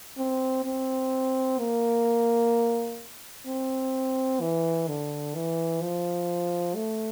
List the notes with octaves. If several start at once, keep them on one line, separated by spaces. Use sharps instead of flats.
C4
C4
A#3
C4
E3
D3
E3
F3
A3